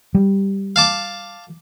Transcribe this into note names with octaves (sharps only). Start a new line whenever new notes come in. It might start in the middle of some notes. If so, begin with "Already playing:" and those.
G3
F5 A5 D6